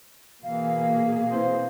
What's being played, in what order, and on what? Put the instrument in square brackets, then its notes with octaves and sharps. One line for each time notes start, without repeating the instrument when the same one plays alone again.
[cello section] B2 A#3 G#4 [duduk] E3 [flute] F5
[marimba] C4 E4 B4 [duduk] C5